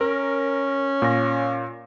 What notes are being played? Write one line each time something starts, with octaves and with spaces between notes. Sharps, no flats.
C#4 A#4
A#2 A#6